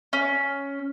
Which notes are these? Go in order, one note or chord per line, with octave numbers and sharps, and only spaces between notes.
C#4